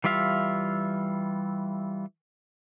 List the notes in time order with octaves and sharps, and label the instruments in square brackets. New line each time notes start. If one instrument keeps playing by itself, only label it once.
[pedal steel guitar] E3 G3 F4 E5 F5